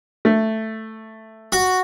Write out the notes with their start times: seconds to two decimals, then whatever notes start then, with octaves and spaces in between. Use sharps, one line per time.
0.25 A3
1.52 F#4